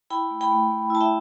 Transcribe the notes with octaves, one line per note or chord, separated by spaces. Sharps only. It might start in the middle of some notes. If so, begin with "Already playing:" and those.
E4 G5 B5
A3
G5 B5
A3
A3
E4 A5
E5 G5